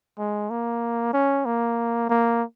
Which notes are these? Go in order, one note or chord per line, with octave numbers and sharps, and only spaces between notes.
G#3
A#3
C#4
A#3
A#3